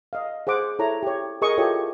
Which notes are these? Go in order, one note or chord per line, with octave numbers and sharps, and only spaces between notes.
D#5 F5
G#4 C5 F#5 D6
E4 A4 C#5 A#5
G4 C#5
G#4 A#4 D#5 C#6 D#6
E4 F4 G4 A4 C#5